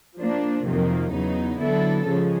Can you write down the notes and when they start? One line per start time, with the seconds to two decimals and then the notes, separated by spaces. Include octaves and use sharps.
0.17 F3 A#3 D4
0.65 F2 C3 D#3 F#3 A#3
1.12 E2 C#3 F#3 B3 D#4
1.60 D3 F#3 B3 E4 A4
2.07 C#3 F3 G#3 C#4